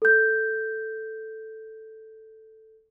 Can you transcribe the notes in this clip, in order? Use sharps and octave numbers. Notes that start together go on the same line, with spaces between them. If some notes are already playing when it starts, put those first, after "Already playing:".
A4 G6